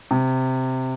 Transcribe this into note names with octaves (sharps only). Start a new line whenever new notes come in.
C3